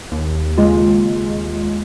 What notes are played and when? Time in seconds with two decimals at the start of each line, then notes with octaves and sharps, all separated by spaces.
0.12 D#2
0.58 C#3 G#3 F4